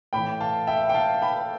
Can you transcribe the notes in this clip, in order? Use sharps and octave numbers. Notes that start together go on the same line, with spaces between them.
A2 E3 G5 B5
F5 A5
E5 G5
G5
F5 A5
G5 B5